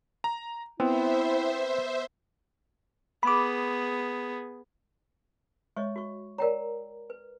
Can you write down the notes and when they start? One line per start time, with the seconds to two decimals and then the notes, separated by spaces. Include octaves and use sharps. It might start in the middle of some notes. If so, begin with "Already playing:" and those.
0.24 A#5
0.80 B3 C4 E4 C5 E5
3.23 B3 G#4 B5 D6
5.77 G#3 C#5 D#5 C#6
5.96 F#4 C#6
6.38 A#4 C#5 D5 G5 A#5
7.10 B4